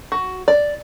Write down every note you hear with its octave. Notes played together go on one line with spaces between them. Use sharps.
F#4
D5